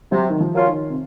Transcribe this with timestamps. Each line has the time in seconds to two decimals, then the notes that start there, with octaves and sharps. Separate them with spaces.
0.12 C3 F#3
0.30 D#3
0.40 F3
0.54 F#3 A#3 C#4 F4
0.68 D#3
0.90 C3